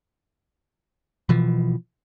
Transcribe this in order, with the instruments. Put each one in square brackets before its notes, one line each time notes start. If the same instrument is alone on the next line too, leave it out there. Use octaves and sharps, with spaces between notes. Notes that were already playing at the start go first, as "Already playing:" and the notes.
[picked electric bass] B2 E3 F3